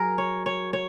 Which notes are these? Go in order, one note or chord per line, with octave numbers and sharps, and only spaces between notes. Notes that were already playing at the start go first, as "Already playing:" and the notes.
Already playing: F#3 G#4 A#4
C#5
C#5
C#5